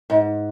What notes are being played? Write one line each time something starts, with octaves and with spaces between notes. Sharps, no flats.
G#2